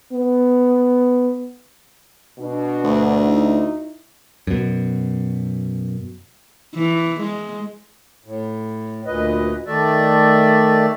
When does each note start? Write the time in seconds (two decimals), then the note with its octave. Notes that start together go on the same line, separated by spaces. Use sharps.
0.13 B3
2.38 B2 D4
2.84 D2
3.27 D#4 E4
4.47 F#2 B2
6.75 E3
7.20 G#3
8.25 A2
9.06 D2 A#2 B4 D#5
9.67 D#3 A3 D5 E5